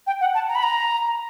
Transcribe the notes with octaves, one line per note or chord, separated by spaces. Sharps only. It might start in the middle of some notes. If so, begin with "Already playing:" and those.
G5
F#5
A5
A#5
B5
A#5